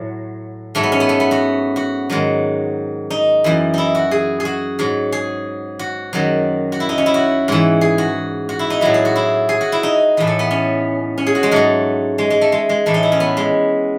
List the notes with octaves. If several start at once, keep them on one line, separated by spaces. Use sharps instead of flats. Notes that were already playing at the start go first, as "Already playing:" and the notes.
Already playing: A2 F#3
G#2 F#3 A3
B3
C#4
B3
A3
B3
F#4
F#4
G#2 D#3 F#3
D#4
F#2 E3
D#4 E4
F#4
G#4
G#4
F#4
G#2 F#3
G#4
F#4
F#2 D#3 F#3
F#4
E4
D#4
C#4
E4
F#4
G#2 E3
G#4
F#4
F#4
E4
D#4
A2 F#3 E4
G#4
F#4
E4
G#4
F#4
E4
D#4
A2 E3
A3
B3
C#4
C#4
G#4
F#4
G#3
G#2 F#3 A3
G#3
G#3
A3
G#3
G#3
A2 E3 A3
D#4
E4
C#4
B3
G#3